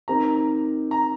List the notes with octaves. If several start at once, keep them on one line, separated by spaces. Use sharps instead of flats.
D#3 C4 D#4 G4 A#4 A#5
A#5